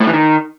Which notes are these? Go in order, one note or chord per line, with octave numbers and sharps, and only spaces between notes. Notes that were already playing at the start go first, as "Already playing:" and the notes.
A2
E3
D#3